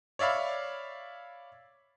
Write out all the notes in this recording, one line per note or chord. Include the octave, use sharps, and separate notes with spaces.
C#5 D5 E5 F5 B5